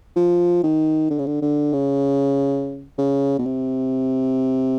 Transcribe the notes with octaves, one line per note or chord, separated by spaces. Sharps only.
F3
D#3
D3
C#3
D3
D3
C#3
C#3
B2
C3